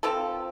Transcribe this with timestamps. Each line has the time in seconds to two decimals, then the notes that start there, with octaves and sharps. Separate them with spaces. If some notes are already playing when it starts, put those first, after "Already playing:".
0.03 F3 C4 F4 A4